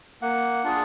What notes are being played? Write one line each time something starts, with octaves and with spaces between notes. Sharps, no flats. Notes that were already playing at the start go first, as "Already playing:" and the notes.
A#3 F#5
D4 F4 G#4